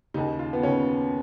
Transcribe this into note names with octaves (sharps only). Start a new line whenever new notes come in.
D#2 C#3 D#4
F4
B3
D#2 C#3 C#4